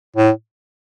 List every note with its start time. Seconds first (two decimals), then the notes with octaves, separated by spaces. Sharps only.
0.16 A2